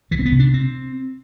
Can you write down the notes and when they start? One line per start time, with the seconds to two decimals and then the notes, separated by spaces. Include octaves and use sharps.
0.11 C2 E3
0.19 C4
0.26 B3
0.32 C3
0.39 D4
0.54 C4